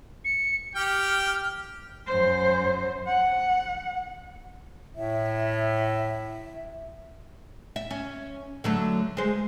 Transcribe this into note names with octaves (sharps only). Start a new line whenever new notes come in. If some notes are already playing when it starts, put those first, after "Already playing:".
C#7
G4 G5 F6
F#2 C5
F#5
A2 E5
E5
C#4
D3 F#3 A3
G#3 C5